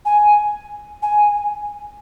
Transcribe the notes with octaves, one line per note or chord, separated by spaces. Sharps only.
G#5
G#5